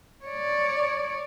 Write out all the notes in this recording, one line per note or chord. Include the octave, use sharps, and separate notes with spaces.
C#5 D5